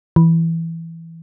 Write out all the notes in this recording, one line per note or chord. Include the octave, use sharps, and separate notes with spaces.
E3